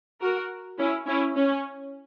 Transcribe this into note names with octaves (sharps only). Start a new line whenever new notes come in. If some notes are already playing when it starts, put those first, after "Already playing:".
F#4 A#4
C#4 E4
C#4 E4
C#4